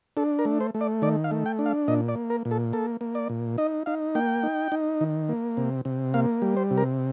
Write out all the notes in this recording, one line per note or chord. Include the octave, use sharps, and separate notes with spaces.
D4 A4
A#4
A3
C5
A3
D5
D#3 D5
F5
A3
G5
D4
F5
A#2 D#5
D5
A#3
A#4
A#2
A4
A#3 A4
A#3
D5
A#2
D#4 D#5
D#4 F5
A#3 G5
D#4
D#4
D#3
A#3
C3
C3
A#3 F5
G3
C5
C3
A#4